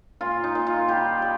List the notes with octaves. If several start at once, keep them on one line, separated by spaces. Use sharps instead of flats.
A#2 F4
D#4
A#2
F4
G3 G4
G3